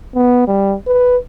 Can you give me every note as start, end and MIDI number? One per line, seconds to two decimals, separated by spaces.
0.15 0.44 59
0.47 0.75 55
0.87 1.17 71